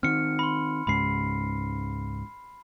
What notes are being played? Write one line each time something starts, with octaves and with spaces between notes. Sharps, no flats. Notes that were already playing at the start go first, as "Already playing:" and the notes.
D#3 C4 F6 C#7
B5 C6
C#2 G#2 C#3 B5 C7